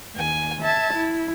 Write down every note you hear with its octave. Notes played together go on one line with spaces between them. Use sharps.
D#2 G#5
E5 A5 G#6
E4